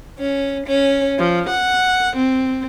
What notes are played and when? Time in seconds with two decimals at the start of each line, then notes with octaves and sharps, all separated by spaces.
0.18 C#4
0.65 C#4
1.18 F3
1.49 F#5
2.16 C4